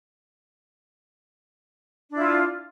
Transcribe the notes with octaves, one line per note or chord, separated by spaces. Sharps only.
D4 E4 F4